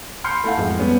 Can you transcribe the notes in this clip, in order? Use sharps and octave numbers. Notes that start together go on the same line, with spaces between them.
B5 C6 F6 G6 C7 C#7
A3 E4 A4 F5 F#5
F2 G#3
G3 B3 C#4